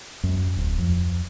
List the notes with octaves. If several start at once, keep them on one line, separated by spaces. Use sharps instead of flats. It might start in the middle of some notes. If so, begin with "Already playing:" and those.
F#2
D1
F2